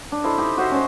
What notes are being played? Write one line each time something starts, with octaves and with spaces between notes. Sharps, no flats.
D4
E4 A4 C5 D#5
D#4 G4
F#4 C5 D#5 E5
C#4 C5